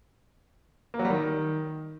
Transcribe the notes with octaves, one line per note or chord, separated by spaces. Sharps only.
A#3
F#3
G3
D#3